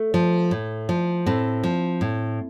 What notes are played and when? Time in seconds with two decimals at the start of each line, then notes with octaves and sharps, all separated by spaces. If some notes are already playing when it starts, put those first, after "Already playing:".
Already playing: A3
0.14 F3
0.51 A2
0.89 F3
1.26 A2 C4
1.63 F3
2.01 A2